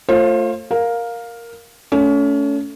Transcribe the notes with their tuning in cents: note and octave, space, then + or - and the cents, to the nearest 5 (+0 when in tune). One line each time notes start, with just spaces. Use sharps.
A3 +30 F4 +0 C5 +35
A#4 +0 F5 +10
A3 +0 C#4 +30